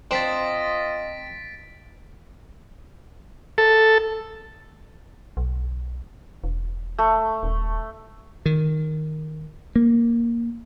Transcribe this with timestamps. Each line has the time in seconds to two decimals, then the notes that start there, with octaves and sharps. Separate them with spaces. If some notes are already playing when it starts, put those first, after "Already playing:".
0.11 C4 D4 F4 C5 D#5 A6 B6 D7
3.58 A4
5.37 B1
6.44 E1
6.98 A3
7.43 D#1
8.46 D#3
9.76 A#3